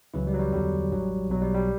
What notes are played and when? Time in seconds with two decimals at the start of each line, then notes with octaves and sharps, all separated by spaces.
0.14 C#2 C#3 E3 F#3 E4
0.27 G3
0.34 F#3
0.39 G3
0.52 E2 D3 F#3 G3
0.91 A1 G2 F#3
1.29 B1 B2 F#3
1.42 G3
1.54 G3